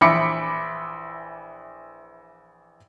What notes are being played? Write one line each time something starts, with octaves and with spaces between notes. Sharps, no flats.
A#1 E3 E5 B5 D6 C#7